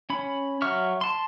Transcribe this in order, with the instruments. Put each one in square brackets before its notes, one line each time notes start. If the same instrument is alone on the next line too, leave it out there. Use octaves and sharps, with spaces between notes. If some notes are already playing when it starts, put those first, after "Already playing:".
[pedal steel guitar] C#4 B5
F#3 E5 C#6 F6
A5 C6